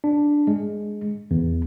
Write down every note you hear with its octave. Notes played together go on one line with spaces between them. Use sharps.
D4
G#3
E2